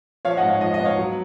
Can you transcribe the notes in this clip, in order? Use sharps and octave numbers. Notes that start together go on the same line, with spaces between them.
F3 C#5 F5
D#5 F#5
G#2
C#5 F5
F3 D#5
D#5
B3
C#5 F5
F#3